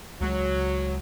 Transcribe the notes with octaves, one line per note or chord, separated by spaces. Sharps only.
C#2 F#3 G#3